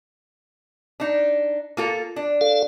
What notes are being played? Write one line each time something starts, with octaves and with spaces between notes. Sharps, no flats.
D4 D#4
A#3 F4 A4
D4
A4 F5